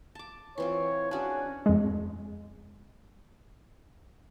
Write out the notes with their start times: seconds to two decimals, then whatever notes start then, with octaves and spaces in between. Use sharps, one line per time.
0.15 A5 D6
0.58 E3 C4 F4 C#5
1.11 C#4 D4 F#4 G#4
1.66 F2 G#3